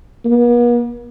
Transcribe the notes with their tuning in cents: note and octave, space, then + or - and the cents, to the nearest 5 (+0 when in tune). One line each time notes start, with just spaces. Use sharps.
B3 -45